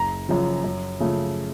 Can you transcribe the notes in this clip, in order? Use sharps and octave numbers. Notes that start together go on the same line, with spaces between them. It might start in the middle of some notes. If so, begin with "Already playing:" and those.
Already playing: F#1 A#5
F#2 C#3 F3
F#2
C#3 F3 A3